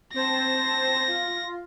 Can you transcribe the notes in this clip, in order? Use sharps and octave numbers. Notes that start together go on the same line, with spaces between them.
C4 C5 A5 A#6
F4